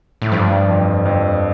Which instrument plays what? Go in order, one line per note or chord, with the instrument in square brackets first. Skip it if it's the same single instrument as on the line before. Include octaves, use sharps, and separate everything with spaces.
[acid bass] A2
[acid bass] G2 [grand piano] F3
[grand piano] F2
F2